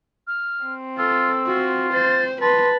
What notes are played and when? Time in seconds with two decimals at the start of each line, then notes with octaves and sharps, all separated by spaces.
0.27 F6
0.65 C4
0.98 F4 A4 E6
1.46 F4 F#4
1.93 C5 A6
2.42 B4 A5 C6